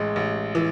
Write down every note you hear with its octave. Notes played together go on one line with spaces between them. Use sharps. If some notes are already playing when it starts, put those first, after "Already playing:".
Already playing: A1 G#3
A1
E3